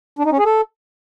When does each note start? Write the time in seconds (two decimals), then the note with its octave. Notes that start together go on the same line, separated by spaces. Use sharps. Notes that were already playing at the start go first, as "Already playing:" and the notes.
0.19 D4
0.26 D#4
0.32 C#4
0.39 G#4
0.46 A4